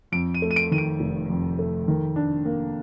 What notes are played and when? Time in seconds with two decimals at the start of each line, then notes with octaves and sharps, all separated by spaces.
0.12 F2 D7
0.34 D#7
0.42 A3
0.51 D#7
0.56 D7
0.71 D#3 D#7
0.78 D7
1.00 F1
1.30 F2
1.59 A3
1.88 D#3
2.16 D4
2.45 A#3